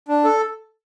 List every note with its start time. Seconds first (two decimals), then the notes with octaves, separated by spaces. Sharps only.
0.08 D4
0.24 A4